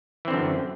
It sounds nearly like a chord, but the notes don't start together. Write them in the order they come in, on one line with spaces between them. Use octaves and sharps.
E3 C4 D3 F#2